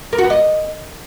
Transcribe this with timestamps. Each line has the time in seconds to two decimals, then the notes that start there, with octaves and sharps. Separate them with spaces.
0.13 A#4
0.18 F#4
0.24 B3
0.30 D#5